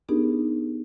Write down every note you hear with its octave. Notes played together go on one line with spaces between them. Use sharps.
B3 D4 D#4 G4 G#4 A#4